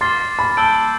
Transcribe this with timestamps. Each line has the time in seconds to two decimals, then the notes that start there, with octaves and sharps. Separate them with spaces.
0.01 C6 D6 F6 A6 C7 G7
0.39 B5
0.57 A5 E6 G6 D7 G7